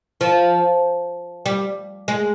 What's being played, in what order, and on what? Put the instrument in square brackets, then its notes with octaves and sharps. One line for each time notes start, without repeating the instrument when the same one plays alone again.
[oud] F3
G3
G#3